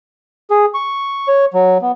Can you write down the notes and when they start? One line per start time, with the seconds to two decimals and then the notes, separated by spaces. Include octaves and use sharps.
0.51 G#4
0.74 C#6
1.28 C#5
1.54 F#3
1.82 B3